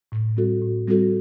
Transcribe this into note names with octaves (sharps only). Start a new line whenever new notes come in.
A2
G3 C4 F#4 A4
A2
G3 C4 F#4 A4